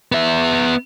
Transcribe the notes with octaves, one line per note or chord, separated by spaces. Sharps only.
B3 E5